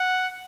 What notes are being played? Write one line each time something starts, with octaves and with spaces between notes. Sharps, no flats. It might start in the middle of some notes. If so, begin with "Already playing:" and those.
Already playing: F#5